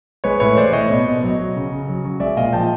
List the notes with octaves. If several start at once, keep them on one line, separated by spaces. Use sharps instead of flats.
G#3 B4 C#5
A2 B4 C#5
E3 C5 D5
A2 C#5 D#5
B2
B2
F#3
F#3
C#3
C#3
F#3
F#3
G#3 D5 E5
A#2 D#5 F5
F3 G5 A5